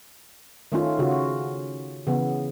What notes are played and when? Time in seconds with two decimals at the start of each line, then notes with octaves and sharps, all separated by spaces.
0.72 D#3 A3 C#4 F4
0.99 C#3 C#4 F4 F#4
2.07 C#3 E3 B3